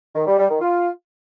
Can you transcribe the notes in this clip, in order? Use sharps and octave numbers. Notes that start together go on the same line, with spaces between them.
D#3
G3
G3
D#3
F4